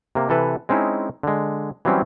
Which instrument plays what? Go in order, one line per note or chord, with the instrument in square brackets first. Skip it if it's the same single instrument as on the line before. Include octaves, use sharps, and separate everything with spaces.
[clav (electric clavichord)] C3 A#3
C3 E3 A4 B4
G#3 C4 C#4 D#4 E4
D3 G#3
E3 F#3 G3 C4 C#4